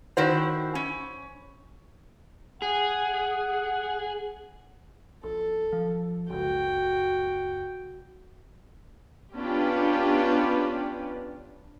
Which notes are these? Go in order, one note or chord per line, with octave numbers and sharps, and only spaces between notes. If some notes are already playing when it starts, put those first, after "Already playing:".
D#3 E4 F#4 C5
C#4
G#4 F#5
A#1 A4
F3
F#1 C#2 F#4 G5
B3 C#4 D4 F4 G4 B4